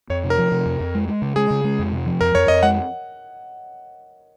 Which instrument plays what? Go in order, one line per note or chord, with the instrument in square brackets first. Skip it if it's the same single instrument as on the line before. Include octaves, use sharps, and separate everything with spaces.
[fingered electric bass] F2 [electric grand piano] C#5
[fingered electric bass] C3
[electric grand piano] A#4
[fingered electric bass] F3
C3
F2
F2
G#3
G#3
C#3
[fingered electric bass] G#3 [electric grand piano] G#4
[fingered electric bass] C#3
G#3
F2
C3
F3
[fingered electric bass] F2 [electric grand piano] A#4
[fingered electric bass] F2 [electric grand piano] C#5
[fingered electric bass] F2 [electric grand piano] D#5
[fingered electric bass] G#3 [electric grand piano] F#5